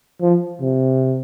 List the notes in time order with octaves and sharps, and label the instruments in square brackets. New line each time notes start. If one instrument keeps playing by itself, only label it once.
[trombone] F3
C3